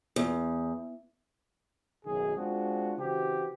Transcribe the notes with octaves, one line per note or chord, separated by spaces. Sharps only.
E2
F#1 B1 F#2 D#3 G#4
G#3 C4 D4 F4 F#4 G#4
C#3 E3 C4 F#4 G4